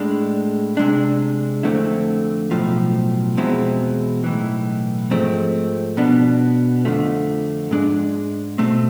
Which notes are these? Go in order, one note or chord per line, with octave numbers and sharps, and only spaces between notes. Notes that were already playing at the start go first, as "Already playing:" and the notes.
Already playing: A2 G#3 D4
C3 G#3 D4
F2 D3 A3 C4 E4
B1 A2 F3
E2 B2 G#3 C4 E4
B1 A2 E3
G#2 F3 A3 C4
B2 B3 D4
F2 D3 F3 A3
G#2 G#3 D4
B2 A3 C4